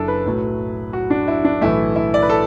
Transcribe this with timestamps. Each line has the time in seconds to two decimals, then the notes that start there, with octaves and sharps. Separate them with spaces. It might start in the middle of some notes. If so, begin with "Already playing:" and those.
Already playing: F#1 F#2 D4 E4 A4
0.08 B4
0.25 B1 A2 F#3 A3
0.93 F#4
1.10 D4
1.28 E4
1.45 D4
1.61 B1 A2 E3 A3 E4
1.96 E4
2.14 D5
2.22 B4
2.30 A4